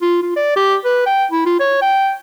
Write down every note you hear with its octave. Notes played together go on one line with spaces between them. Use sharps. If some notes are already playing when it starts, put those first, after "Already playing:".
F4
F4
D5
G4
B4
G5
E4
F4
C#5
G5